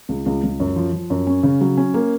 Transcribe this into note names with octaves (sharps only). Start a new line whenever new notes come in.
C#2
C#2
C#2
F#2
F3
F3
F#2
C#4
C#3
F#3
C#4
A#3